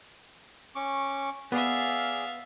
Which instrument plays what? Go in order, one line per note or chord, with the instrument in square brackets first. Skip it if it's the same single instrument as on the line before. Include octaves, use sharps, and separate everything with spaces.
[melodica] C#4 C#6 D6
[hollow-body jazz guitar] B3 [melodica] G#4 D5 [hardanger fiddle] E5 F5